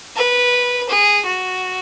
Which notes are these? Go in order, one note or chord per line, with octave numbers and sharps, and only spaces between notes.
B4
G#4
F#4